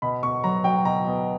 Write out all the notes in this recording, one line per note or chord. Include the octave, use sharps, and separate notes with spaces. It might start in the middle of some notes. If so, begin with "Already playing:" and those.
B2 B5
B2 C#6
F#3 A#5
F#3 G5
B2 A#5
B2